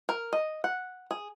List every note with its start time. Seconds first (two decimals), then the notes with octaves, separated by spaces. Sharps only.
0.09 A#4
0.33 D#5
0.64 F#5
1.11 G#4